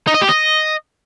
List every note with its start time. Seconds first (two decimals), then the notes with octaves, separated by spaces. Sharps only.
0.07 D#4
0.14 D#5
0.22 G4
0.29 D#5